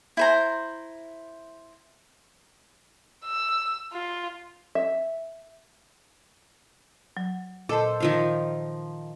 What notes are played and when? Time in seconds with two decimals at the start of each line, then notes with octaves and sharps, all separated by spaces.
0.17 E4 C5 A#5
3.25 E6
3.93 F4
4.75 E5
7.17 F#3
7.69 A#2 A4 C5 D#5 A5
8.00 D#3 F3 F5